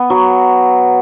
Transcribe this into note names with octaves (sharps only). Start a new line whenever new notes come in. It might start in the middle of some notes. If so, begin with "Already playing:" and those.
Already playing: B3
F#3